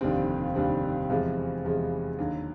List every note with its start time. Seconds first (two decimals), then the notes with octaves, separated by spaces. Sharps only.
0.01 F1 D#2 D3 G3 C4
0.55 F1 D#2 D3 G3 C4
1.10 E2 C3 F3 G#3
1.64 E2 C3 F3 G#3
2.19 D#2 D3 F#3